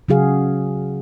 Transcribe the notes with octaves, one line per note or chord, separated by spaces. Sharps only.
C#3 F#3 F#4 G#4 F5